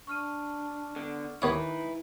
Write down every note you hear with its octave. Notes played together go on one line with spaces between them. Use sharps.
D4 C#6 F6 D#7
D3 B3
D#2 D#4 E4 B4 C#5 D#6